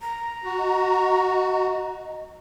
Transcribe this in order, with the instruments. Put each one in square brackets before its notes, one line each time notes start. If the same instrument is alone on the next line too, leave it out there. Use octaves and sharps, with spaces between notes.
[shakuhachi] A#5
[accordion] F#4
[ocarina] D#5